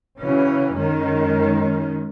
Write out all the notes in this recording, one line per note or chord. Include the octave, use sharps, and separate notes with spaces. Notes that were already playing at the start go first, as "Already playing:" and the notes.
C#3 E3 F#3 C#4
F#2 D#3 G#3 C#4